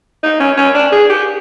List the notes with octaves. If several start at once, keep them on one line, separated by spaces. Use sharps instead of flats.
D#4
C#4
C#4
D4
G#4
G4